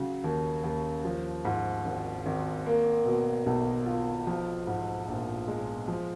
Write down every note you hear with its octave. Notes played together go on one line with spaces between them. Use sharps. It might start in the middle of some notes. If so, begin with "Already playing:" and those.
Already playing: C#3 F#3
D#2
D#2
F3
G#2
G#1
G#1
A#3
B2
B1
F4
F3
G#2
A#1
G#3
F3